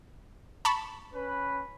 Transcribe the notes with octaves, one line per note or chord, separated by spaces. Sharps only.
A5 B5 C#6
C#4 B4